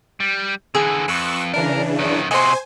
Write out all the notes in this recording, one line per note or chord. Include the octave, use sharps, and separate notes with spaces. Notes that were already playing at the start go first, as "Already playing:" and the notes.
G3
D3 E3 G#4
F2 B4 C#6 E6 F#6
C#3 E3 D4 A#4
F#2 D#3
C3 F#4 C5 D#5 G#5 C6